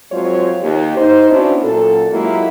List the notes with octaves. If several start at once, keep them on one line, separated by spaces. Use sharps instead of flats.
F2 F#3 G#3 F4 C5 C#5
D#2 G4
D#4 C5
B3 C#4 D4 E4 F#4 C5
F#2 A#2 A4
F#3 G#3 A#3 E4 F4 G4